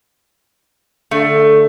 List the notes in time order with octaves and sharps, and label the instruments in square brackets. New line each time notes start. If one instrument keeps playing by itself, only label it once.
[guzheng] D3 [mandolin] A3